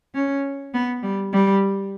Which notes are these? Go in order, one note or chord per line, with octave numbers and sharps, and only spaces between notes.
C#4
B3
G3
G3